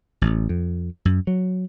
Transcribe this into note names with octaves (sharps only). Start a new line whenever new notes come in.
A1
F2
F#2
F#3